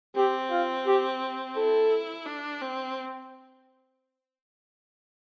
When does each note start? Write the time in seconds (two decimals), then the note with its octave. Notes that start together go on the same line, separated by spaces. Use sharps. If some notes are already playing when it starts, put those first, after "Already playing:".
0.16 C4 G4
0.51 F4
0.86 G4
1.56 E4 A4
2.26 D4
2.62 C4